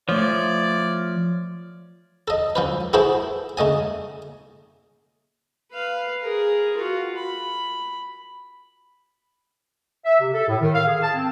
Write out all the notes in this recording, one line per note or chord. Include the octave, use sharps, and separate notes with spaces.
F3 A3 C#5 D5
A4 D#5
F3 C#4 B4
E4 F#4 G#4 A4 B4 C5
C#3 A3 D#5 G#5
B4 F5
G#4 A#4
F4 F#4
B5
E5
C3
A4
A2
D#3
F5
G#4
A5
C4